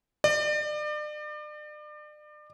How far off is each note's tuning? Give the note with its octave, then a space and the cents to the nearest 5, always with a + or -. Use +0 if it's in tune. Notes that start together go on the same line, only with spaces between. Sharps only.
D5 +35